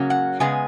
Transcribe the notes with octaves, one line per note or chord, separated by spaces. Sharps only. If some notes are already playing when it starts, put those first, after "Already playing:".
Already playing: C#3 F#3 A#3 C#4
F#5
C#3 G#3 B3 G#5